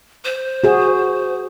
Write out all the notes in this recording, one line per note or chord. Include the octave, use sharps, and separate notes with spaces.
C5
F#4 G#4